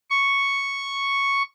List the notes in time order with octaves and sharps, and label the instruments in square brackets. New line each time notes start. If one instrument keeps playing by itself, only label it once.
[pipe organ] C#6